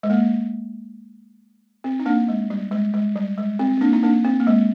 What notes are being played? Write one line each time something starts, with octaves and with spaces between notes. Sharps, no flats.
G#3
A#3
C4
D#4
A#3 D4
G#3
G3
G#3
G#3
G3
G#3
C4
C4
A#3 D4
D#4
A#3 D4
C4
A#3
G#3